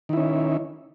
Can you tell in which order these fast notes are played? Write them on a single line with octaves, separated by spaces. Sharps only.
D#3 E4 C#4